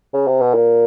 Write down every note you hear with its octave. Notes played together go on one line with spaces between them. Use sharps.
C#3
C3
B2
A#2